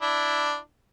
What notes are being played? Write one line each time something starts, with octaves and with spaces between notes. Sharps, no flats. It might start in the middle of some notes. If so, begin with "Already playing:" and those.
D4 E4